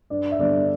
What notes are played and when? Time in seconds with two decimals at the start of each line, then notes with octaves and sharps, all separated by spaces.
0.10 G2 D5
0.31 E5
0.39 D3 G3 B3 D4 D5